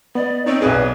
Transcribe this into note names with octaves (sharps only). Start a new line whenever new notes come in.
B3 D5 D#5
C4 D#4 C#5 D#5
B1 B3 G#4 B4
D5